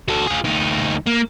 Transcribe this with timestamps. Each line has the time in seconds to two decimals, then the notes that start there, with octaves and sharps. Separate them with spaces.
0.08 F#4 A4
0.27 F4 G#4
0.44 D2 D#4
1.06 A#3